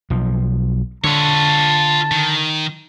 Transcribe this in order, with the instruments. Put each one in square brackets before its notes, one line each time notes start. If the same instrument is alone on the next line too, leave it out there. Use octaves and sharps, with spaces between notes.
[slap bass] B1 F3
[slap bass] D3 [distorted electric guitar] F4 C#5 [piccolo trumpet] A5
[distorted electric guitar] D#3